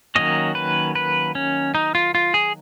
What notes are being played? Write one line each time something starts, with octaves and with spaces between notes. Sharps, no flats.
D#3 F#3 A#3 C#4 D#5
B4
B4
C#4
D#4
F4
F4
G#4